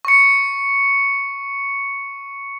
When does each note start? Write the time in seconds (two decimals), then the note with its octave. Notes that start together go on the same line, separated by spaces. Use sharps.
0.05 C#6 C#7